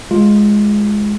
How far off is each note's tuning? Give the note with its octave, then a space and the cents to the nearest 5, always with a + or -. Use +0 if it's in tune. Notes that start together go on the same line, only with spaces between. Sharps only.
G#3 +0 F4 +0